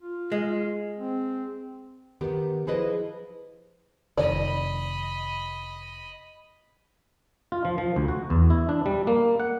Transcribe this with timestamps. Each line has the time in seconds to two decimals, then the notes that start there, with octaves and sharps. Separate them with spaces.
0.02 F4
0.32 G#3
0.98 C4
2.21 D#3 B3 G4
2.67 F3 E4 G#4 B4 D#5
4.17 F1 D#3 D5 D#5 B5
7.52 F4
7.65 F3
7.78 F3
7.96 D2
8.08 F#4
8.30 E2
8.50 E4
8.69 D4
8.86 G3
9.07 A#3
9.40 F#5